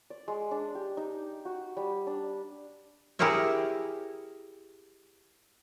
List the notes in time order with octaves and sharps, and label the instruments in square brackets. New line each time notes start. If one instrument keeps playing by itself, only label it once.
[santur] D5
G#3
D4
G4
D#4
F#4
G3
D4
[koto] E4 G4 G#4 A#4 C#5 E5